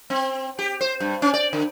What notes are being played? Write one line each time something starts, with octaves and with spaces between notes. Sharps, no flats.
C4
G4
C5
G2
C#4
D5
D3